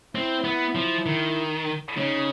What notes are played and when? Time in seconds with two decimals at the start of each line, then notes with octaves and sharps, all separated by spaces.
0.15 C4 E4
0.45 B3
0.75 F3
1.06 D#3
1.97 C#3 D#4